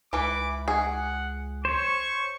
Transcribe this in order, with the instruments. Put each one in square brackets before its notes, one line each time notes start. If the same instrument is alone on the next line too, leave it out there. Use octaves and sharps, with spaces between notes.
[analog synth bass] C#2 [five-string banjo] E3 B4 [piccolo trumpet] D6
[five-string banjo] G#4 [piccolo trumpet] F#5
[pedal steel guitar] C5 C#5 [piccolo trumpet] C#6